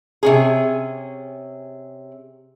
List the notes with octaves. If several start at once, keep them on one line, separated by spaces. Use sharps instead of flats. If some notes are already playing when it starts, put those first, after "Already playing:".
C3 C#4 G#4